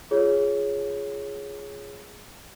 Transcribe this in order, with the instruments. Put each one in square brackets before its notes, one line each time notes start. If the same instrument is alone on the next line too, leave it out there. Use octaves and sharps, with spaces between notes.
[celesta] F4 G#4 C#5